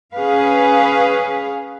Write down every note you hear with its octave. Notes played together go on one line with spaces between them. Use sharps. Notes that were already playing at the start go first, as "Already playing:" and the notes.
C#4 G#4 B4 F5